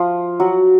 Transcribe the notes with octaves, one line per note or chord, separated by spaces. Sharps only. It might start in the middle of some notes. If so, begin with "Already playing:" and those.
Already playing: F3 F4
F#3 F#4